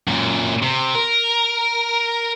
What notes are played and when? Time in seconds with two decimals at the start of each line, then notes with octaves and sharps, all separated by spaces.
0.08 F#2 A#2
0.62 C3
0.95 A#4